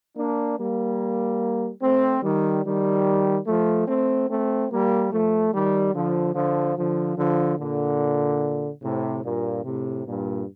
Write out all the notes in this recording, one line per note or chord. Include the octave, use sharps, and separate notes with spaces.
A#3 D4
G3 A#3
A3 C4
D#3 G3
D#3 G3
F3 A3
A3 C4
A3 C4
G3 A#3
F3 A3
D#3 G3
D3 F3
D3 F3
D3 F3
D3 F3
A#2 D3
A2 C3
G2 A#2
A2 C3
G2 A#2